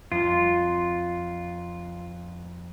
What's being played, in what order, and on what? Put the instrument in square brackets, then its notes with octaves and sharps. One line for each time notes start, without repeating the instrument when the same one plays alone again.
[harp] F2 [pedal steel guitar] F4